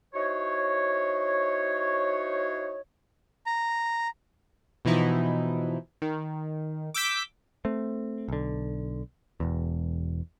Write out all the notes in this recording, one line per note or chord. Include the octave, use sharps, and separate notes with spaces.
D#4 E4 F#4 C5 C#5
A#5
B2 E3 F3 D#4 E4
D#3
D6 E6 G6 B6 D7
A3 C4
B1 D3
E1 E2